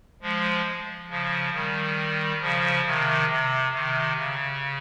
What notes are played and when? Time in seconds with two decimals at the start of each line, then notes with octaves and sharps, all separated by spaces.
0.22 F3 G#3
1.10 C#3 F3
1.54 D#3 G3
2.41 C#3 F3
2.86 C3 D#3
3.29 C3
3.73 C3 D#3
4.17 C#3